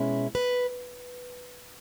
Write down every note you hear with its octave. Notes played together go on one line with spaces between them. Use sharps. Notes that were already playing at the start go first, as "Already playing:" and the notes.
Already playing: B2 G#3 C#4 E4
B4